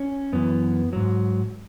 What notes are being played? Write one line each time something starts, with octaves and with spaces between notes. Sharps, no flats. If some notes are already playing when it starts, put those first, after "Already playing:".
Already playing: C#4
F#2 E3 B3
G#2 F#3